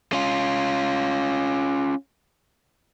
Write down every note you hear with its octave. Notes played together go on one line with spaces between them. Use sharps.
C#4 F4